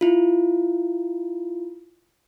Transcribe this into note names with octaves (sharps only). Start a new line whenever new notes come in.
E4 F4